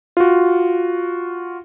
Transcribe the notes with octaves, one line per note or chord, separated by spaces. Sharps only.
F4 F#4